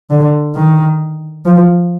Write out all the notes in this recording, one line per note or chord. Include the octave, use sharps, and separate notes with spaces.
D3
D#3
F3